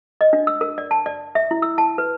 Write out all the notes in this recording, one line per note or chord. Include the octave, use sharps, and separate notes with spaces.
D#5
D4
E6
A#4
D5
A5
D5
E5
E4
E6
A5
B4